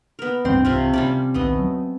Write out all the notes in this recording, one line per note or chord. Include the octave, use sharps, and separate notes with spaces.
B3 A#4
D1 G2 C4 C6
C2 C3 A3 F4
C3 G3 C#4 D5
D#1 B1 D#3 A3 B3 D#5
F#3